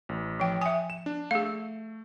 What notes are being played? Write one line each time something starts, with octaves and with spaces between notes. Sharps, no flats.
A1
F3 G5
E5 G#5 D#6
E7
D4
A3 G#4 F5